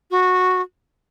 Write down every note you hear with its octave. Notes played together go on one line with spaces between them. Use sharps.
F#4